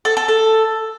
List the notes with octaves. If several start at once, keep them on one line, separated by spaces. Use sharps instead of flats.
A4
A4
A4